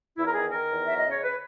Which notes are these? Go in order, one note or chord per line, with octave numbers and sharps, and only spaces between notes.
E2 E4
A#4
D#3 G#4
D#3 A#4
E2
F#3 E5
D#5
C#3
C#5
B4